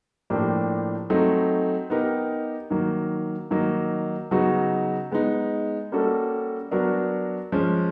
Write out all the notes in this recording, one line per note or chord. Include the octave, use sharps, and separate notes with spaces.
A2 F3 A#3 D4 G4
F#3 A3 C4 D#4
B3 D#4 G4 A#4
D#3 F#3 A#3
D#3 F#3 A#3 D#4
C#3 F#3 B3 D#4 F#4
G#3 B3 D#4
G3 A#3 C#4 F#4 A4
F#3 B3 D4 F#4 A#4
F3 G#3 C#4